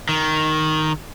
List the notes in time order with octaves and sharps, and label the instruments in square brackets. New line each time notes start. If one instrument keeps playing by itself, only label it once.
[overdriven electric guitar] D#3